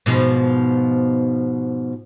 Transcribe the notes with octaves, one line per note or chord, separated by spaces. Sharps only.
G#2 B2 F3